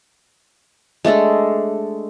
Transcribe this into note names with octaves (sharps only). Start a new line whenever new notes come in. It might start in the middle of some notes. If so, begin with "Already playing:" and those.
G#3 A3 D4 A4